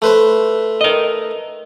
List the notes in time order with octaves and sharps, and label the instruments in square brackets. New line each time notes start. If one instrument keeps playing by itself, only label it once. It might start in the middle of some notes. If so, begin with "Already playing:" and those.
[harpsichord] A3 B4 C5
[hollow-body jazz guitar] A#4 D#5